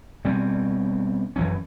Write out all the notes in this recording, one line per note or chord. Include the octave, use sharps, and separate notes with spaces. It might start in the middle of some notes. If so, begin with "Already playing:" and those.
B2 G3 C4 C#4
F#2 E3 F#3 C#4